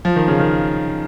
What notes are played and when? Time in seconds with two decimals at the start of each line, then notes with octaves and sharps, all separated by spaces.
0.05 F3
0.16 D#3
0.28 C#3
0.40 D#3